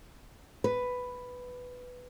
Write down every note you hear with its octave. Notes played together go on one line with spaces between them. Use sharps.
B4